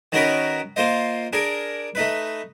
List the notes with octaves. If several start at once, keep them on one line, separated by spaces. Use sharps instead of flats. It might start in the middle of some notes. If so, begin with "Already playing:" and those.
D#3 C#4 D#4 F#4 A#4 B4
A#3 F4 C5 D#5
D4 G#4 A#4
A3 D#4 B4